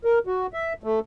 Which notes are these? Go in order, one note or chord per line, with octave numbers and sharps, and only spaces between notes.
A#4
F#4
E5
A3